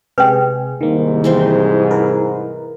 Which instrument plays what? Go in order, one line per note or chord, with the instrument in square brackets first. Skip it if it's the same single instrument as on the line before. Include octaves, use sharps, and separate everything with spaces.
[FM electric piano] C3 G#3 G#4 [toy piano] B4 G5
[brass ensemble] C2 G#2 [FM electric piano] D#3 A#3
[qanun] E3 C4 C5
[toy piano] E4 [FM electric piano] A#4 B4